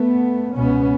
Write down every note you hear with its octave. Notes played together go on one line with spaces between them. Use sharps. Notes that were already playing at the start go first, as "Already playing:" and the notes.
Already playing: A3 B3
C#2 B2 B3 C#4